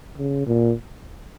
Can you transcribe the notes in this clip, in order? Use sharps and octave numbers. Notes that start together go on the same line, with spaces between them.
C#3
A#2